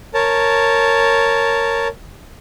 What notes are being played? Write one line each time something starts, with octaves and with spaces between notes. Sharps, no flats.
A#4 C#5 A5